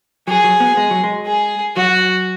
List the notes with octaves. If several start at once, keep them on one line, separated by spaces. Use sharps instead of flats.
F#3 G#4
F#3
B3
G#3
F#3
G#3
G#4
F#3 F#4